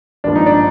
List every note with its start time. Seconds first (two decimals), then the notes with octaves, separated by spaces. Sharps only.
0.24 G#1 G2 F3 A#3 D4
0.35 D#4
0.46 D4